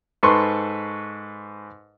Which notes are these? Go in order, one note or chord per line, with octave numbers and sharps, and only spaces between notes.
G#2 A4 B4 C6 C#6